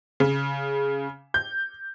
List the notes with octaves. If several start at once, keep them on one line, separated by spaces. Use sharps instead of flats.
C#3
G6